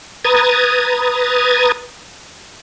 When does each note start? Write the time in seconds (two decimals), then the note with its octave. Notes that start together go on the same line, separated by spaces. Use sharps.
0.25 B4 A#5 D#6 G#6 A6